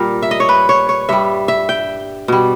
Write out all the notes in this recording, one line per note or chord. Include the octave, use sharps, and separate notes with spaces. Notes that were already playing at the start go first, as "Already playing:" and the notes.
Already playing: A#2 G3 A#4
E5
D#5
C#5
B4
C#5
C#5
G2 G3 E5
E5
G5
B2 G3